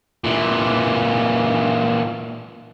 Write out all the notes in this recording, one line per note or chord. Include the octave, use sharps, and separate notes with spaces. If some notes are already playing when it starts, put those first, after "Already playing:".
A#2 E3